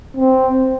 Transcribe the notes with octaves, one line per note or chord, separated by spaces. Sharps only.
C4